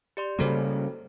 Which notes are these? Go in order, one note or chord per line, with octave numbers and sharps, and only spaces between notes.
G4 D5 C6
C#3 G3 A#3 F#4 A4 C5